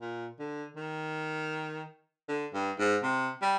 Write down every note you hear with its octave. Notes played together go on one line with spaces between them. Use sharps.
A#2
D3
D#3
D3
G2
G#2
C3
G3